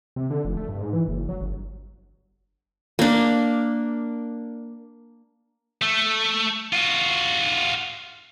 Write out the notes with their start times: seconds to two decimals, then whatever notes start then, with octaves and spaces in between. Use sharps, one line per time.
0.16 C3
0.30 D3
0.45 F1
0.57 A3
0.69 G2
0.81 G#2
0.93 E3
1.08 F#1
1.29 F#3
1.41 G1
2.99 A#3 D4
5.82 A3
6.73 F4 F#4